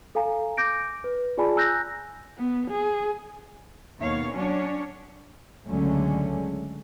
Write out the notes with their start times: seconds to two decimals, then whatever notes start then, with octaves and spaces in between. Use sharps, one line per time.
0.15 A4 F5 G#5 A#5
0.57 D6 G6 A#6 D7
1.04 B4
1.37 F4 G#4 D5 G#5 A5 B5
1.56 G#5 A#5 E6 F#6 G6 A#6
2.38 B3
2.70 G#4
4.01 D#2 B2 C#5 F5
4.34 F#3 C#4 D4 C#5
5.68 C#2 D3 F#3 G#3 A3 C#4